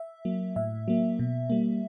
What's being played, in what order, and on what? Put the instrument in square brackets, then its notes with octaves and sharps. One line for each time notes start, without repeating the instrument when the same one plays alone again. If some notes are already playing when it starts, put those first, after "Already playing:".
Already playing: [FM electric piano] E5
F#3 A#3
A2 E5
F#3 A#3
B2
G3 A#3